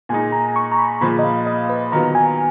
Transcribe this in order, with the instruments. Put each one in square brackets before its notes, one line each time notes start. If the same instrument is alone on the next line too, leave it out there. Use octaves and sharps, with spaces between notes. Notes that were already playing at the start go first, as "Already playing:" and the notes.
[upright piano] A#2 G#3 D#4 [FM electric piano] G#5
[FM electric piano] A#5
C#6
A#5
B5
[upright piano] A#2 F3 G#3 [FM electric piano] B5
[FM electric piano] D#5
F5
D#5
B4
[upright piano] D#3 F#3 B3 F4 [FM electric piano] A#5
[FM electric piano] G#5